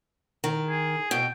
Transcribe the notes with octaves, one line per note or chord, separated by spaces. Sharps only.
D#3
G#4
B2 G5